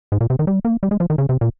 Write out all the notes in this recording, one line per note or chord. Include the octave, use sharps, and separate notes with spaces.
G#2
A#2
C3
D#3
G3
A#3
G3
G#3
F3
D#3
C#3
C3
A#2